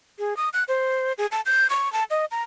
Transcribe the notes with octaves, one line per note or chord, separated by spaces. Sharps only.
G#4
D#6
F#6
C5
G#4
A5
G6
C#6
A5
D#5
A#5